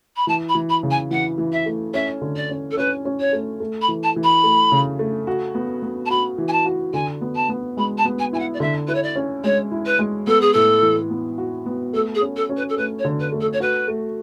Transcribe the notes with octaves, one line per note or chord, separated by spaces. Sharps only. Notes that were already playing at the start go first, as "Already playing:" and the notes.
B5
E3 A5
B5
E3
B5
C#3
G#5
E3 F#5
E3
E5
A3
C#4 E5
D3
D5
C#4
A4
C#4 B4
C#4
C#5
A3
A3
B5
E3
A5
E3
B5
A3
C#3
A3
F#4
B3
B3
A5
F#4 B5
E3
G#5
A5
F#4
D3 G#5
B3
A5
B3
G#3 B5
A5
B3
G#5
E4 G#5
F#5
D5
D3 E5
E4 B4
C#5
D5
C#4
G#3 C#5
E4
B4
G#3
B3 A4
G#4
A2 A4
E3
B3
F#4
B3
A3 A4
G#4
C#4
A4
C#4
B4
A4
A3 B4
C#5
D3
B4
A3
A4
C#5
F#4 B4
A3